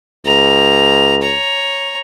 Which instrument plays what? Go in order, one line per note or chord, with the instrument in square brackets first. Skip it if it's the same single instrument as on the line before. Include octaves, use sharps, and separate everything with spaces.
[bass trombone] C#2 [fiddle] A#5
[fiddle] C#5 A#5